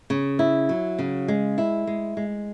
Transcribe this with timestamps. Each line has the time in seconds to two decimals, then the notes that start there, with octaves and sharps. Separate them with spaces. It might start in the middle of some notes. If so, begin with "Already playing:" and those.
0.10 C#3
0.39 E4
0.69 F#3
0.99 C#3
1.28 G#3
1.58 E4
1.87 G#3
2.17 G#3